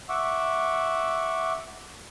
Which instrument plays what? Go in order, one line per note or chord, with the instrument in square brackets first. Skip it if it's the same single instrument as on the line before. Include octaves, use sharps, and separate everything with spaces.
[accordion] E5 F#5 C#6 D6 E6